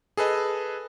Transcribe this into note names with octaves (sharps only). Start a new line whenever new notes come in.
G#4 A4 B4 D#5